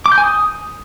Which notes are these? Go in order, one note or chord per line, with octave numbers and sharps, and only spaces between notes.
D6
G6
G#5
D#6